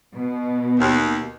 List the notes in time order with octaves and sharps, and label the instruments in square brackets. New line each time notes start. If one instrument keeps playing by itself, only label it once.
[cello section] B2
[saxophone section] D#2